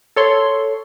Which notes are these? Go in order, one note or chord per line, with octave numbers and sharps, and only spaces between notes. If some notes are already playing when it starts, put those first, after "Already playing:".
A4 C#5 C6